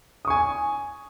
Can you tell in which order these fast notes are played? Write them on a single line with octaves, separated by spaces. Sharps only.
D#6 C#6 G#5